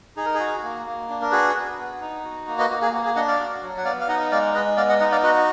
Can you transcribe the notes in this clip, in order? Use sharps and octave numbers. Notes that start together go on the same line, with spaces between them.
D#4 G#4
A#4
G#4
F#4
A#3
A#3
D4
A#4
F#4 G#4 B4
B3
B3
D#4
F#4
A#3
B4 D#5
A#3 F#4
G#4
A#3 F#4
G#4
D4 D#5 F#5
D5 F5
F#4
F#3
F#5
B3 D5 F5
F5
D#4 D#5 F#5
G#3 D5 F5
G#3 B4 D#5
B3 D5 F5
D#5 F#5
D#4 D#5 F#5
D5 F5
F#4 B4 D#5